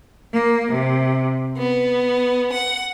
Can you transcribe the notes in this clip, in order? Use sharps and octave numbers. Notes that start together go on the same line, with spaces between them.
A#3
C3
B3
F#5